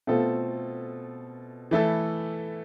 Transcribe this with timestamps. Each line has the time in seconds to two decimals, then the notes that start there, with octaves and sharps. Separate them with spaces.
0.07 B2 A3 C4 F4 A4
1.71 E3 A3 E4 A4